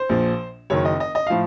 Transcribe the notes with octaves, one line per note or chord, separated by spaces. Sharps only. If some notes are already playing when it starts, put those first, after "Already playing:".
Already playing: C5
A#1 A#2 F3
F#1 F#2 D#3 C#5
D#5
D#5
D#5
A2 F3 F5